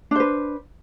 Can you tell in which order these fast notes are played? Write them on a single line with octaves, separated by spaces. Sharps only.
D4 C5 B4